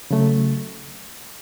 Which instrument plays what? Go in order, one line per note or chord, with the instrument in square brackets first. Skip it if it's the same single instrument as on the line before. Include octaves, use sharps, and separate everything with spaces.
[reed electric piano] C#3 F#3 A3